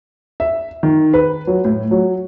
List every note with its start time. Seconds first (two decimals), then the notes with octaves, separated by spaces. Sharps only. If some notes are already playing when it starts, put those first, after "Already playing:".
0.40 E5
0.83 D#3
1.14 B4
1.47 F#3
1.65 A2
1.91 F#3